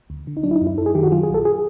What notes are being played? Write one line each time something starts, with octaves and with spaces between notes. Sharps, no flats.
D2
D3
D#4
F#3 D4
E4
D#4
F#2
E4
F#2 A4
G#4
D#3 G4
F#4
F#3 F4
G#4
A#1
A4
G#4